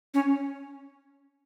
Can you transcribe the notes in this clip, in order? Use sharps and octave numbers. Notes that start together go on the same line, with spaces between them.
C#4